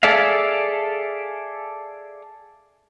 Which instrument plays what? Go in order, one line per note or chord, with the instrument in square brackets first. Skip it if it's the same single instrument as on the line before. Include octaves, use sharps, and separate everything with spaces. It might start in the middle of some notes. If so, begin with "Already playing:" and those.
[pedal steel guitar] G#4 A4 D5 E5 F5